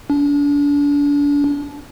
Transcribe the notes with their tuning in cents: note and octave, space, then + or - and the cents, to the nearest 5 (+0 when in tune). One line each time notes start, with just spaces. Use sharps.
D4 -35